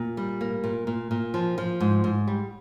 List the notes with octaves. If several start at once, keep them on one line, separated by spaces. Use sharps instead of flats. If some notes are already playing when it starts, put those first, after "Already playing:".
Already playing: A#2
G3
A#3
A#2
A#2
A#2
F3
F3
G#2
G#2
G3